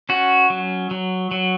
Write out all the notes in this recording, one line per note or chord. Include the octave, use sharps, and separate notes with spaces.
C#4 F#4
F#3
F#3
F#3